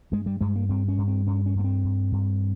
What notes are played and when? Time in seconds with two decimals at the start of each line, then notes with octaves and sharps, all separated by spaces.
0.12 G2 G#3
0.26 G3
0.41 G2 G#3
0.56 A#3
0.69 G2 C4
0.88 C#4
0.98 G2
1.08 C4
1.27 G2 C#4
1.46 C#4
1.56 G2 A#3
1.64 C4
1.84 G2
2.12 G2